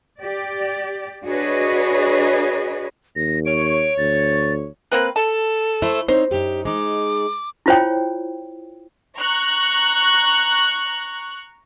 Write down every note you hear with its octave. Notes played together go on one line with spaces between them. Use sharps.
G4 D5
D4 F#4 G#4 B4 C#5 D#5
D#2 A#6
C#5 D7
D2 A6
A#3 C4 B4 F#6
A4 A5
A3 E4 C5
C4 D#4 C5 C#5
F#2 D#4 G4
G#3 D#4 D6
E4 F4 C5 C#5 G5
A#5 C#6 F#6